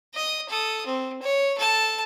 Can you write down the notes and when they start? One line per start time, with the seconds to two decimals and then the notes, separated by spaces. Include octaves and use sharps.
0.14 D#5 D#6
0.49 A4 D#6
0.86 C4
1.22 C#5
1.58 A4 A5